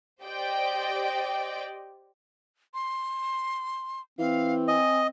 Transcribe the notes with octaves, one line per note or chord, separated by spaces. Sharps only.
G4 C5 D5 D#5 G5
C6
E3 C4 F5
D#5 G#5